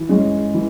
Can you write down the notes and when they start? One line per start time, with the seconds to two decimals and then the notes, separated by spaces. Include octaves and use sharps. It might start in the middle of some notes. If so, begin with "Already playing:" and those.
Already playing: E3
0.09 G#3 C#4
0.54 E3